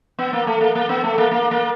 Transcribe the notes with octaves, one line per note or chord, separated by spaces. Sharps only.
B3
A#3
A3
A#3
A#3
B3
A3
A#3
A#3
A#3